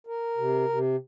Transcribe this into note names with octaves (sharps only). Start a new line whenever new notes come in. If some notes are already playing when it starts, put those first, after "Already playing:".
A#4
C3
C3